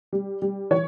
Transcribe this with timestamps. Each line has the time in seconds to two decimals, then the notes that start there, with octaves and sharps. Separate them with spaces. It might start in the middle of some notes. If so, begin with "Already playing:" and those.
0.13 G3
0.42 G3
0.71 E3 C#5